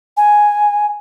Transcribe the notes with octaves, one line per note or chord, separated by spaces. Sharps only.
G#5